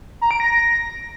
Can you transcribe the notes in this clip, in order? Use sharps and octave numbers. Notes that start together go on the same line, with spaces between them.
A#5
D7
A#6